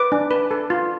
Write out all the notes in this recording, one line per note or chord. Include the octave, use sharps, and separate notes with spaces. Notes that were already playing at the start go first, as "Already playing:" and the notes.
Already playing: B4 D6
D4
B4
A4
F4